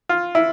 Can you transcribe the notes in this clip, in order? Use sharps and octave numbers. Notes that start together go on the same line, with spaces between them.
F4
E4